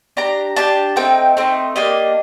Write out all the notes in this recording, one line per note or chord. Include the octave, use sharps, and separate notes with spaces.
D4 G4 A#5
D4 G4 A5
A3 C4 D#4 G5
A3 C4 D#4
A#3 D4 G4 D#5